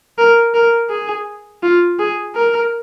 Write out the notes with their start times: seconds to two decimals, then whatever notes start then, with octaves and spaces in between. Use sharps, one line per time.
0.18 A#4
0.54 A#4
0.90 G#4
1.63 F4
1.99 G#4
2.36 A#4